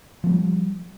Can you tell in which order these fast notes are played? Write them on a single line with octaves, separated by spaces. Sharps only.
F3 A3 G3